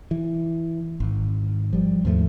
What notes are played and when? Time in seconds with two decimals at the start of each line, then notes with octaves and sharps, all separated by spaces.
0.11 E3
1.00 G#1
1.73 F3 G3
2.05 D#2 G#2 F3 A3